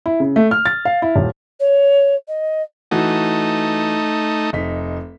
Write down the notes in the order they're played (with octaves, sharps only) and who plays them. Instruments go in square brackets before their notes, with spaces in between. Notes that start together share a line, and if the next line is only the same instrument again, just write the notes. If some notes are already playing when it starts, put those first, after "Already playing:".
[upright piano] E4
C#3
A3
F6
A6
F5
E4
D#1
[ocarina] C#5
D#5
[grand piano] E3 F#4 [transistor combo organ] A3 D#4
[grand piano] F1 D#4 B6